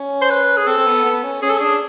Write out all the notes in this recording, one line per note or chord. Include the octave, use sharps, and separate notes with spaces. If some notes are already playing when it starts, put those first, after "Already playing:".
Already playing: C#4
C5
B4
G#4
C4 A4
C4
B3
B3
C#4
C#4 G#4
A4
D4 G#4